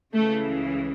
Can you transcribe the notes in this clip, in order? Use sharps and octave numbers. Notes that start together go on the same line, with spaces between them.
C#2 C#3 E3 A3